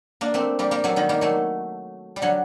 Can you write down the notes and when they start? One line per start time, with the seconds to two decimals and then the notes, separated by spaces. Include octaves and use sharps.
0.21 A#3 D4
0.34 A3 C4
0.59 G3 A#3
0.71 G3 A#3
0.84 F#3 A3
0.96 D#3 G3
1.09 G3 A#3
1.21 F#3 A3
2.16 G3
2.22 D3 F#3